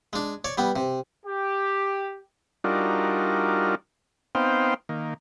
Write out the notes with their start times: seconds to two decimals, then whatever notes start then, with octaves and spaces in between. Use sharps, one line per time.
0.13 G#3 D4
0.45 C#5 D5
0.58 G3 B3
0.76 C3
1.25 G4
2.64 G3 D4 D#4 F4 F#4 A#4
4.35 B3 C4 D#4 C5 F5 G5
4.89 D#3 A#3